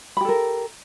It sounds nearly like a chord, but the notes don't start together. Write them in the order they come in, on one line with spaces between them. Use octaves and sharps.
B5 G4 A4 A#4